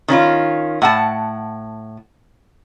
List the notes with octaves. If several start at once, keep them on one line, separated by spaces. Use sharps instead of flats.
D#3 C#4 E4 F4
A2 F#5 A5